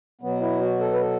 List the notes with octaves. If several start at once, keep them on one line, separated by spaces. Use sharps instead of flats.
B2 F#3 B3
E4
F#4
A4
B4
A4